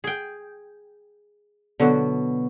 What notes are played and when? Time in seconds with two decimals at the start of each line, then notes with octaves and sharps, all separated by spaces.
0.04 G#4 G5
1.80 B2 D3 F#3